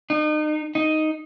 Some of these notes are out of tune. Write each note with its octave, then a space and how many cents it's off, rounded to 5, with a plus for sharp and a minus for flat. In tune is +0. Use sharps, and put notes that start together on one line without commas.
D#4 -35
D#4 +0